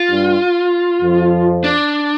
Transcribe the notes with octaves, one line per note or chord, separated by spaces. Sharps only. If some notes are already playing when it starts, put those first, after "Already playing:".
Already playing: F4
G2 G3
F2 F3
D4